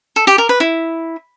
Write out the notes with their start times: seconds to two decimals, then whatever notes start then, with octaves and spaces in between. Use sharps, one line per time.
0.16 A4
0.27 G4
0.38 A#4
0.49 B4
0.60 E4